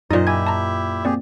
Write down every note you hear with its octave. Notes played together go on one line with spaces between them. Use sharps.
F#2 A#2 D#4 C5 D5 D#5
E4 G4 E5 G#5 G#6
A5 A#5
A#3 C4 G4 G#4 D5